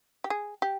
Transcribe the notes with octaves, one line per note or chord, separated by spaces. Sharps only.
G4
G#4
G4